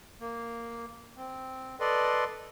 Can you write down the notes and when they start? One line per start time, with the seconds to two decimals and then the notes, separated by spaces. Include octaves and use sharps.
0.21 A#3
1.17 C4
1.80 A4 B4 D5 D#5 C6